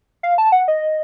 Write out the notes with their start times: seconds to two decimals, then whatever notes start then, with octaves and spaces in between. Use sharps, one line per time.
0.23 F5
0.38 A5
0.52 F#5
0.68 D#5